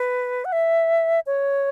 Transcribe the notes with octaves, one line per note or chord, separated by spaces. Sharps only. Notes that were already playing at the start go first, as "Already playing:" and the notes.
Already playing: B4
F#5
E5
C#5